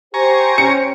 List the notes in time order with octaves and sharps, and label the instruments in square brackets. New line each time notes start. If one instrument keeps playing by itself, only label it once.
[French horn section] G4 [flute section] C5 G5 [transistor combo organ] G#5 A#5 C#6
[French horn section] C#4 [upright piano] C#7